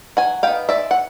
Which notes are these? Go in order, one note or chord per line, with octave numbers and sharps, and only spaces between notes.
F#3 F#5 G#5
B3 D#4 F5 G5
G#3 D5 E5
F#5